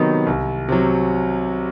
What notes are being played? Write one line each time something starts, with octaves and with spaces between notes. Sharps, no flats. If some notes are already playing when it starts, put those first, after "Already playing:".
Already playing: C3 D#3 F#3 B3 D#4
C2
C3 F#3